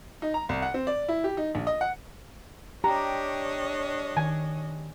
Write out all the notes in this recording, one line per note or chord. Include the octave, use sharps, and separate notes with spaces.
D#4
A#5
C2
F#5
C4
D5
E4
G4
D#4
A#1
D#5
F#5
D4 G4 C#5 D#5 A#5
D#3 G#5